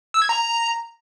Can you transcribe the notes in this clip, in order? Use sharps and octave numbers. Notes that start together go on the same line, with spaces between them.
E6
G#6
A#5